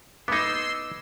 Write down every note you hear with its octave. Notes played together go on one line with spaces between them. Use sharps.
B3 D#4 C6 D6 E6 G#6